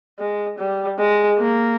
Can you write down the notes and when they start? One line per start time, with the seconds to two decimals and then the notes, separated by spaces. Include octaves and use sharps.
0.19 G#3
0.59 G3
0.99 G#3
1.39 A#3